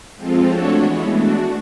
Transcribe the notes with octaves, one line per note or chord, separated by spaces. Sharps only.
F3 G#3 C4 F4 A4
A3 D4 F#4 A4 C#5
E3 G#3 B3
A3 D4 F#4